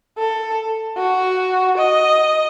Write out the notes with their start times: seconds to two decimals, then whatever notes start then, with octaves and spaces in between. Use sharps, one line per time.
0.18 A4
0.97 F#4
1.78 D#5